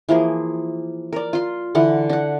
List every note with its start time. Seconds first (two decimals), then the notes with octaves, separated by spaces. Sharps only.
0.09 E3 F3 A#3 G#4
1.13 A#4 D5
1.33 F4 C6
1.75 D3 E3 F#5
2.10 D4 F#5